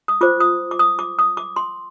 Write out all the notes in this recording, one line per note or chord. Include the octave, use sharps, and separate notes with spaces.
D#6
F4 C5 D6
D#6
D6
D#6
D6
D#6
D6
C6